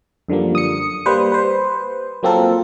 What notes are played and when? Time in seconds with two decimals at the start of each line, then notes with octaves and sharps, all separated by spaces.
0.29 F#2 D3 F3 G3 A#3
0.55 D#6 C#7
1.06 G3 A#3 B4 C5
1.32 B4 C5
2.23 F#3 A#3 C4 F4 A4 A#4